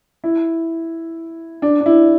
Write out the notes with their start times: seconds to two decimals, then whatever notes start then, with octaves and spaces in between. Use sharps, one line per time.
0.24 E4
1.62 D4
1.80 D4
1.86 E4